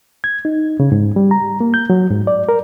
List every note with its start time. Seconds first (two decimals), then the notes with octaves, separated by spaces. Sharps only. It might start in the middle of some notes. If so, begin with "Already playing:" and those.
0.24 G#6
0.45 D#4
0.80 C#3
0.92 G#2
1.16 G3
1.31 A#5
1.60 A#3
1.74 G6
1.90 F#3
2.10 G#2
2.27 D5
2.49 A#4